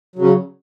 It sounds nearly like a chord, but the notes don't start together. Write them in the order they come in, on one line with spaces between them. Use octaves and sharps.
F#3 C#3 C#4